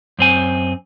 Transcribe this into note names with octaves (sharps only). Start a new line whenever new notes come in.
F#2 C4 G#5